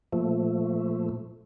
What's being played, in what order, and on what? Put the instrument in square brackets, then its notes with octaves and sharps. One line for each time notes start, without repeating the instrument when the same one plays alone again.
[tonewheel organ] A#2 F3 A3